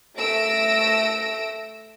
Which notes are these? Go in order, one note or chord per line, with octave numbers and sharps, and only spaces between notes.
A3 E6 A#6 D7